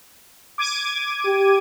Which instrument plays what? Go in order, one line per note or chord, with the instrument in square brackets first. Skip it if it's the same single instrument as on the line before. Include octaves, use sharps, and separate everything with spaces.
[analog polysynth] D6 G#6 D#7
[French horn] G4